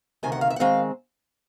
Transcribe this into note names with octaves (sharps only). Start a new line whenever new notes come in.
D2 C3 D#3 G#5
F#5
F5
E5
F#5
D#3 G#3 C4 F5